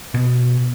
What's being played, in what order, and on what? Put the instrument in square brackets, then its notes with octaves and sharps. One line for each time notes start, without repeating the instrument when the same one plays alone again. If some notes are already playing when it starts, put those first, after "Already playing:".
[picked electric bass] B2